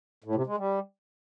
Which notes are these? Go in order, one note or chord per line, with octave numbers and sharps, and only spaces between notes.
A2
C3
G#3
G3